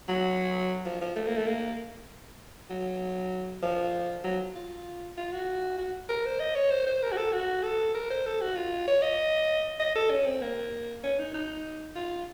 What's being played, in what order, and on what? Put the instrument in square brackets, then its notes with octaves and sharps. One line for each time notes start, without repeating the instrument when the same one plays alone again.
[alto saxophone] F#3
F3
F3
A3
A#3
A3
A#3
F#3
F3
F#3
F4
F4
F#4
F#4
A#4
C5
D#5
C#5
C5
C5
A#4
F#4
A4
F#4
A4
A#4
C5
A4
F#4
F4
C#5
D#5
D#5
A4
C#4
C4
A#3
C#4
D#4
D#4
F4